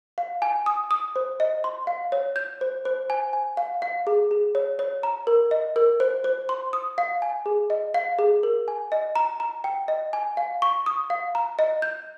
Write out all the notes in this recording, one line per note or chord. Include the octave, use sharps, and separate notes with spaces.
F5
G#5
D#6
D#6
C5
D#5
C6
F5
C#5
G6
C5
C5
G#5
G#5
F5
F5
G#4
G#4
C#5
C#5
A#5
A#4
D#5
A#4
C5
C5
C6
D#6
F5
G#5
G#4
D#5
F5
G#4
A#4
G#5
D#5
A#5
A#5
G5
D#5
G#5
F5
C#6
D#6
F5
A#5
D#5
G6